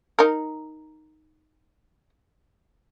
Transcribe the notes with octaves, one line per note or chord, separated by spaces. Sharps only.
D#4 A#4